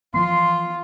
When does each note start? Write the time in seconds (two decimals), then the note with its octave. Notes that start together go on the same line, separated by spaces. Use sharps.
0.14 E3 F3 B3 F4 C6